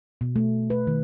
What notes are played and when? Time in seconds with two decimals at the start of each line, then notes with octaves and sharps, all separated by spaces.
0.21 B2
0.36 A3
0.70 B4
0.87 D#3